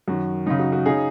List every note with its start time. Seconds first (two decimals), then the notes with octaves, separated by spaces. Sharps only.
0.08 F#2 D#3 F#4
0.46 F#2 C#3 D#4
0.59 F#4
0.72 F#4
0.86 C#3 D#4 G#4